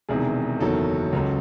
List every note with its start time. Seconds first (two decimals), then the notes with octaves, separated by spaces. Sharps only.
0.09 E1 E2 C3 D#3 G#4
0.60 F#1 E2 D#3 F#3 A4
1.13 C#2 C#3 F#3